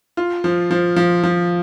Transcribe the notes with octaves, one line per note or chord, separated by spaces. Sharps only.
F4
F3
F3
F3
F3